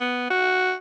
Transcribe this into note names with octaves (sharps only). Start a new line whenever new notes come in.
B3
F#4